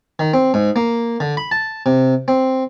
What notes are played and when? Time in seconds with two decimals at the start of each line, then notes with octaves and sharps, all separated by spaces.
0.19 D#3
0.34 C4
0.54 G#2
0.76 A#3
1.20 D3
1.37 B5
1.51 A5
1.86 C3
2.28 C4